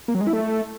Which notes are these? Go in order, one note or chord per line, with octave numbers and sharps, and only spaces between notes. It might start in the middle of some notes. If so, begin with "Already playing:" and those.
A#3
F#3
G#3
E4
A3